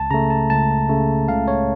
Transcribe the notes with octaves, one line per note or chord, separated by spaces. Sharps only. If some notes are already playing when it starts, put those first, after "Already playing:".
Already playing: C#2 A5
C#3 A3 A#5
A5
C#2 A5
C#3 A3
C#2 F5
C#5